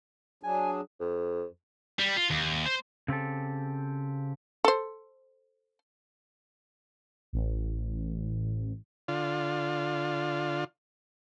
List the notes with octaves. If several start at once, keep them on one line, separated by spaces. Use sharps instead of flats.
F#3 D4 G#4 G#5
F2
G3
F4
D#2
C5
C#3 C4 G4 A4
A4 C5
A1
D3 F4